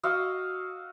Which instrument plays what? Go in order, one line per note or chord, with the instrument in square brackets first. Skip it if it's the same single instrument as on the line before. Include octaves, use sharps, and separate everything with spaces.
[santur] F#4 D#5 F5 E6